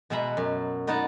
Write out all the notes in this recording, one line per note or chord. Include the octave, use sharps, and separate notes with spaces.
B2 G#3 E5 F#5 A#5 B5
F#2
B3 D#4 D5 F#5 A5 A#5